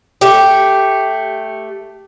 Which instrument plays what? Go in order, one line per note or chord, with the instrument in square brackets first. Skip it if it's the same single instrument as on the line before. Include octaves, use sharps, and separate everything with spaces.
[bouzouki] A3 G4